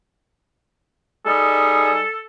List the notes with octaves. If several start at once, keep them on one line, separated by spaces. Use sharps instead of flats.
G3 D#4 G#4 A4